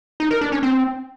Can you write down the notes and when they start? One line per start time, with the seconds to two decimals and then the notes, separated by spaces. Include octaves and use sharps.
0.20 D#4
0.31 A#4
0.41 D4
0.52 C#4
0.63 C4